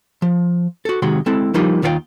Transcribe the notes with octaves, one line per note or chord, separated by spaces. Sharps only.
F3
F#4 A4
C3 D#3 G#3 F#4 C6
G#3 C4 E4 A4
F3 G3 A#3 D#4 F4
D#2 D#3 F4 C5 F5 G5